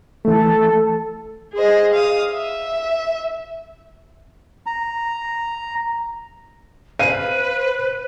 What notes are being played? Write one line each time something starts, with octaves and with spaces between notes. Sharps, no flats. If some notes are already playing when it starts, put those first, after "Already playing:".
E3 A3 A4
G#4 C5 D#5
F5 D#6
E5
A#5
B4 C5 F5 D#7